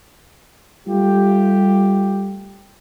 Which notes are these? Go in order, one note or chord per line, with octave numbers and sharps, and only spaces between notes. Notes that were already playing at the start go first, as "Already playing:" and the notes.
G3 A3 F4 G4